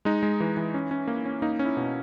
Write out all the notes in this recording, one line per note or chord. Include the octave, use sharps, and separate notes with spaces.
G#3 D#4
G#3
E3
E3
C#4
C#4
A#3
C#4
A#3 D#4
C#4
E4
B2